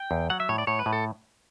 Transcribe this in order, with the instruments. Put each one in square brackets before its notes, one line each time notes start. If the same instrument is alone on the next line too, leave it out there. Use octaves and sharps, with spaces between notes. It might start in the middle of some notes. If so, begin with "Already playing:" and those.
Already playing: [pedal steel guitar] G5
[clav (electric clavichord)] E2
[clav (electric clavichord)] F#3 [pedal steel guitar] F#5
[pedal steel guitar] E5
[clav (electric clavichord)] A2 [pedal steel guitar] C#5
[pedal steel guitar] D5
[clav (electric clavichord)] A2 [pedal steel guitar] C#5
[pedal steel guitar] B4
[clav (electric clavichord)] A2
[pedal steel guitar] A4